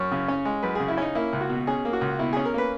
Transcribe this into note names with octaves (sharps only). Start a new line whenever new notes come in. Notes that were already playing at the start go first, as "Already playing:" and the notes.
Already playing: F#2 C#5
C#3
C#4
G#3
F#2 B4
C#3 G#4
E4
C#4 D#4
A#3 E4
C#2
F#4
B2
C#4 G#4
A#3
F#4
C#2
B2 E4
C#4 G#4
A#4
A#3 B4